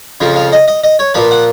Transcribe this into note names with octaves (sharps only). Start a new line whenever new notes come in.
F2 C#3 F3
F5
D#5
D#5
D#5
C#5
A#2 F3 B4
F#5